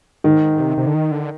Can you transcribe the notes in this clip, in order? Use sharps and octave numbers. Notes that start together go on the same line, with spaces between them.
G#2 D#3
C3
C3
D3
D#3
D3